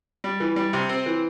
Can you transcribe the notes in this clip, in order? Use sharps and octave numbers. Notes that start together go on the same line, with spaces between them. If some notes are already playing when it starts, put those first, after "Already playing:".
G3
E3
G3
C3
C4
E3